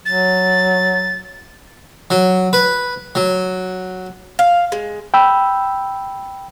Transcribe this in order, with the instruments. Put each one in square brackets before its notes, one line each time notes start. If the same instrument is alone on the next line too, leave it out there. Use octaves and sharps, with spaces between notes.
[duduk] F#3 [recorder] A6
[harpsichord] F#3
B4
F#3
[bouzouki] F5
G#3
[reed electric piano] G5 B5 E6